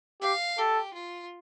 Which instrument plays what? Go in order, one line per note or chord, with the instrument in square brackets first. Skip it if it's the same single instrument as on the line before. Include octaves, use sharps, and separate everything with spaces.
[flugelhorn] G4 [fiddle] F5
[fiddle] G4 [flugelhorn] A4
[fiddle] F4